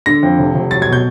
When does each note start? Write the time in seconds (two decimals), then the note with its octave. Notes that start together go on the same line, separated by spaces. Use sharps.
0.06 D3 A#6
0.23 F2
0.39 F1
0.55 F1
0.71 F#3 A6
0.82 G#6
0.88 B2
0.93 G6